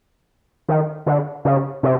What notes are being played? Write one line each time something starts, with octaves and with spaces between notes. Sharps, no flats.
D#3
D3
C#3
C3